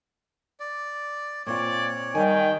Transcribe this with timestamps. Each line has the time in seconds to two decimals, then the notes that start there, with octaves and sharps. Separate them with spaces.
0.60 D5
1.46 A#2 C4 F4 C#5 D5
2.15 D#3 G3 G5 G#5